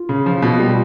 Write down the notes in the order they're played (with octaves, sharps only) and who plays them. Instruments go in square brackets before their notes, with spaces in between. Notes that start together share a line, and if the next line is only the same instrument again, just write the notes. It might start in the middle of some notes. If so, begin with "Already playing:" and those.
Already playing: [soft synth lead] F4
[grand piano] C#3
F3
B2
G3